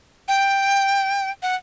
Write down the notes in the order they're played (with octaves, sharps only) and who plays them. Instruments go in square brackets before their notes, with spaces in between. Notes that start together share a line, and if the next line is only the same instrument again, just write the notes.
[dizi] G5
F#5